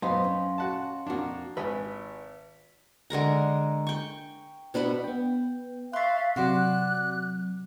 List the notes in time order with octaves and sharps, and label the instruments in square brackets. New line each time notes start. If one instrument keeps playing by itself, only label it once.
[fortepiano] F#2 [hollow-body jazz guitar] B3 D#4 C5 [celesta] D#5 F5 C6
[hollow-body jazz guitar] C#4
[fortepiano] F#4 F#5 A5
[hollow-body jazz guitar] F2 F#4 [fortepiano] A#3 D4
[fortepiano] G#1 [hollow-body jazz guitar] B4 D#5 G#5 [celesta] B6
[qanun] D3 G#3 A#4 A#5
G5 C#6
B2 D4 B4 B5
[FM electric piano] B3 G5
[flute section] E5 F5 [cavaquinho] C6 C#6 [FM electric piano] F#6 A6
[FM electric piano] C3 F#3 [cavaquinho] F#4 C5 D5 [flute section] F#6